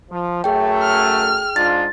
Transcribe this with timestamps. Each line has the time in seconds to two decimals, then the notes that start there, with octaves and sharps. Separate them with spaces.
0.11 F3
0.44 F#2 A3 G#4 G5
0.83 F6
1.56 G#2 D4 F4 A6